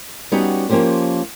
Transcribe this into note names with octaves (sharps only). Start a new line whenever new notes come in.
G3 B3 C#4 D#4 F#4 G4
F3 A#3 C#4 G4 C5